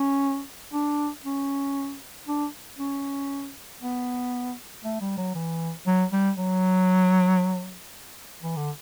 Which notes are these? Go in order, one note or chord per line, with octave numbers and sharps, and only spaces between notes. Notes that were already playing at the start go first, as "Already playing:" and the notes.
Already playing: C#4
D4
C#4
D4
C#4
B3
A3
G3
F#3
E3
F#3
G3
F#3
E3
D3